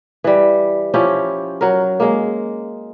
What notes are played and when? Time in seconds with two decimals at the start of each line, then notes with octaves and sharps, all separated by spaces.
0.24 E3 G3
0.94 F3 C#4 E4 G4
1.61 F#3 A#4
2.00 G#3 A#3